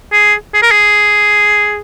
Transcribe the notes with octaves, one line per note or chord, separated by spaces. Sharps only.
G#4
G#4
A#4
G#4